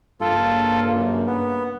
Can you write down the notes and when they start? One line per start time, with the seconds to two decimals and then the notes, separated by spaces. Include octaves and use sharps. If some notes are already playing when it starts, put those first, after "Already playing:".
0.21 G2 C#3 A#3 F4 A4
0.94 F#2
1.27 B3